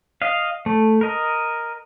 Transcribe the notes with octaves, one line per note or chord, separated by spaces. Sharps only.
D#5 F5
A3
A#4 D#5